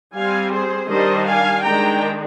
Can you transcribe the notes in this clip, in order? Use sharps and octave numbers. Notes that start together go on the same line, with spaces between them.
G3 C4 F5 G#5
G#4 C5
D#3 G3 D4 C5 D#5
F5 G#5
D#3 G#3 D4 G5 A#5